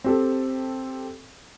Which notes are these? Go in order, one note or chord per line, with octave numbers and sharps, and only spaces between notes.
C4 G4 A4